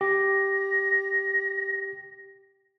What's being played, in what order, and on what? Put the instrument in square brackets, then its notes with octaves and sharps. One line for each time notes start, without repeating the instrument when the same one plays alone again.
[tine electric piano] G4 [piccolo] A#6